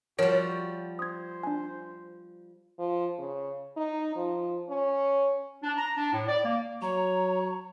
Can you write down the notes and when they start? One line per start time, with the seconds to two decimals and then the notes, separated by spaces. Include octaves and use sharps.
0.19 F3 G3 F#4 A#4 C#5 D7
0.99 C5 D#6 G#6
1.43 D4 G#5
2.79 F3
3.19 C#3
3.77 D#4
4.16 F3
4.69 C#4
5.64 D4
5.78 A#5
5.97 D4
6.13 A2
6.28 D5
6.45 A#3
6.82 F#3 C#5 A#5